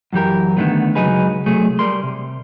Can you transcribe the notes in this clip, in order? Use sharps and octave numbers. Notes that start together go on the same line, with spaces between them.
F#2 E3 G4 A#4
D3 D#3 F3 A3 B3
C#2 F#2 F#3 D#4 G#4 B4
C3 F#3 A3 G#4
G3 A#4 C6
C3